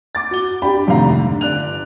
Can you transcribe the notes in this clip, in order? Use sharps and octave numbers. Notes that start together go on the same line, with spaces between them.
D6 A6
F#4 G7
D4 G4 B5
G#1 F2 C3 A3 F5 A#5
D3
G1 D5 F#6 F7